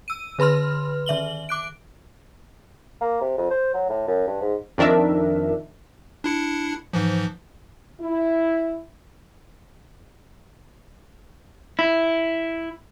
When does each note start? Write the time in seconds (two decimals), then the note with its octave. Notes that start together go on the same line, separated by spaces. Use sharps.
0.08 E6 D#7
0.39 D3 B4 B5 C6 F6
1.06 D#3 E5 F#7 G7
1.49 D6 F#6 D7
3.01 A#3
3.21 C3
3.38 F2
3.51 C5
3.74 F#3
3.89 A2
4.08 F#2
4.27 G2
4.42 G#2
4.78 F2 D#3 D4 A#4 E5
6.24 D4 E4 C#7
6.93 G#2 E3 F3
8.00 E4
11.79 E4